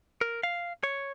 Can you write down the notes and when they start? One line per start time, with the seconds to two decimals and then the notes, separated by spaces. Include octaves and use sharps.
0.21 A#4
0.43 F5
0.83 C#5